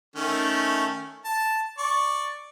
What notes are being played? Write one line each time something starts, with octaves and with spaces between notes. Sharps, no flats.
D#3 A3 C#4
A5
D5 C#6